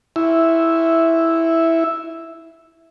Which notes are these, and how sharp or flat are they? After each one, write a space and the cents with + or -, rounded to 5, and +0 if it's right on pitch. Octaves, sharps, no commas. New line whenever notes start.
E4 -5 E5 +0